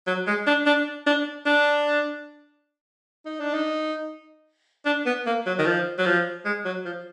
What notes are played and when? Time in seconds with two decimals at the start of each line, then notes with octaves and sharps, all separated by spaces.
0.07 F#3
0.27 G#3
0.47 D4
0.66 D4
1.06 D4
1.46 D4
3.26 D#4
3.40 D4
3.54 D#4
4.86 D4
5.06 B3
5.26 A#3
5.46 F#3
5.59 D#3
5.66 F3
5.98 F#3
6.06 F3
6.45 G#3
6.65 F#3
6.85 F3